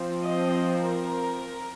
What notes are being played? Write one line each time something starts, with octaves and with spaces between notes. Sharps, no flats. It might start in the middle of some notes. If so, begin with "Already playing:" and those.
Already playing: F3 C4
D#5
A#4